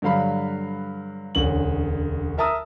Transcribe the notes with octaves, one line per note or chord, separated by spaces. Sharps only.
G2 D3 F#3 F5 B5
E1 D2 C#4 F#7
A#4 E5 A5 A#5 D#6 E6